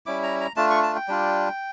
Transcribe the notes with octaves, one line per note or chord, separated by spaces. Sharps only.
G3 C#4 E4 D6
A#5
A#5
A3 D4 F4 A5
C#6
A5
G5
G3 D4 F4